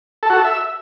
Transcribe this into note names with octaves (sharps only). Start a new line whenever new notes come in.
A4
F#4
A4
E5